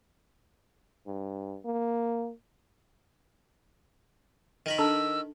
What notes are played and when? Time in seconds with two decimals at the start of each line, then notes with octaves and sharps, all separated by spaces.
1.07 G2
1.65 A#3
4.66 D#3 A#4 B5
4.78 D4 A4 A5 E6